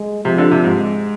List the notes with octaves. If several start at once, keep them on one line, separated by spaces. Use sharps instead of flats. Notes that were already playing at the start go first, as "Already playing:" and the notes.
Already playing: G#3
C3 F3
D3
C3
G#2
G#3